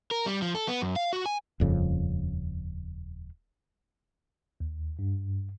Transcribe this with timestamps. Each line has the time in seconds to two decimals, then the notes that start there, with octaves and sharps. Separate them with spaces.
0.11 A#4
0.26 G3
0.42 F3
0.55 A4
0.68 B3
0.82 F#2
0.96 F5
1.13 F#4
1.26 G#5
1.60 D#1 F2 C#3
4.60 D#2
4.99 G2